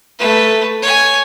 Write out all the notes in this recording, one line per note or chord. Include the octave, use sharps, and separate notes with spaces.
A3 B4
C#5 G#5